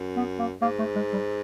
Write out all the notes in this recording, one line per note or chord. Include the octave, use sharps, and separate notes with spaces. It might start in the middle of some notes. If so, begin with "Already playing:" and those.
Already playing: F#2
B3
A#3
G#2 A#3
A3
G#3
G3